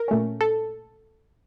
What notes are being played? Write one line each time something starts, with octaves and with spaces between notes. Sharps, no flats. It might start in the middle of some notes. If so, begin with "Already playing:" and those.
Already playing: A#4
A#2 A3 C#4
A4